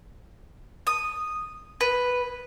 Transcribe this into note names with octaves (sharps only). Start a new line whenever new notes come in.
D#6
B4